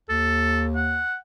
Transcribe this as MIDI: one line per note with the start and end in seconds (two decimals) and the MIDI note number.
0.10 1.01 39
0.10 0.64 69
0.76 1.15 78